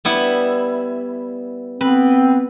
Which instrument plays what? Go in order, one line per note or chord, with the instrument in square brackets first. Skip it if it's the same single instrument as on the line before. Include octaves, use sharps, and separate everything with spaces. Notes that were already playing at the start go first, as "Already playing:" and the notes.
[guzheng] G3 B3 E4
[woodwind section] B3 C4 [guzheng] B4